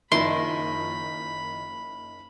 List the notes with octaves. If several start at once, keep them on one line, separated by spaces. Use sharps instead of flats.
F#1 D#3 F3 D#4 E4 B5 C6